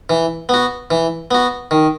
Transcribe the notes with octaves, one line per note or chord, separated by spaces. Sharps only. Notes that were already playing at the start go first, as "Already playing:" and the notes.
E3
B3 F#4
E3
B3 F#4
D#3